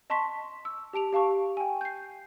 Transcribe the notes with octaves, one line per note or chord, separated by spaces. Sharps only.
D#5 A5 C6 C#6 B6
E6
G4 A5 D7 F7
G4 F5 A5 C#6
G5 G#5
G6 C7